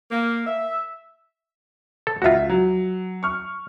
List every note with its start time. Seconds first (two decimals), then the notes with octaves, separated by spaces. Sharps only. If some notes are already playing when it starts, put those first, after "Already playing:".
0.11 A#3
0.47 E5
2.07 A4
2.22 C#2 F4 F#4 E5
2.49 F#3
3.23 C#6 F6